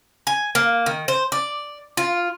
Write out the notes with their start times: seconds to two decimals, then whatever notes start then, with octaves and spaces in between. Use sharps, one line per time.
0.27 G#5
0.55 A#3
0.86 D#3
1.08 C5
1.32 D5
1.97 F4